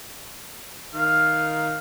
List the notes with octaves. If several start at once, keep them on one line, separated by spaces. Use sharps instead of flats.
D#3 F5 F6